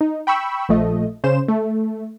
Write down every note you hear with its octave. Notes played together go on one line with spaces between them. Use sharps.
D#4
G5 B5 C#6 E6
A#1 F3 A3 D#5
C#3 C5 E7
A3